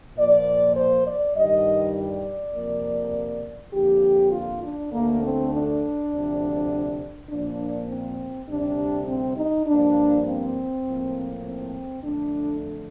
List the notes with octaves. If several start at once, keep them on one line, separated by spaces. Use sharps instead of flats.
A#2 F3 A#3 D5
C5
D5
G2 D#3 G3 D#5
D5
F2 C3 F3 A#3
F2 D3 F3 A#3 G4
F4
D4
D2 D3 A3 A#3
C4
D4
D2 C3 F3
A#2 F3 A#3 D4
C4
D2 C3 G3 D4
C4
D#4
G2 F3 A#3 D4
C4
A2 F3 A#3
C4
F2 D3 A3 D4